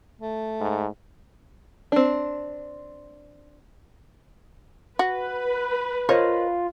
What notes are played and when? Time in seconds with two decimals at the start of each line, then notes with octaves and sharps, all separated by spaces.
0.20 A3
0.60 G#2
1.92 C4 D4
4.99 F#4 B4
6.09 F4 A#4 C5 C#5 D#5